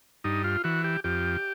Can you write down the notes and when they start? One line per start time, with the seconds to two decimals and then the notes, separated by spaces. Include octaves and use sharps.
0.24 G2 D#4
0.44 F4
0.64 E3 F#4
0.84 G4
1.04 F2 G4